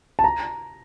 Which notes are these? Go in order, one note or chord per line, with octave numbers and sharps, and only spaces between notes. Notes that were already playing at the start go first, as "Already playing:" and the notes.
A5
A#5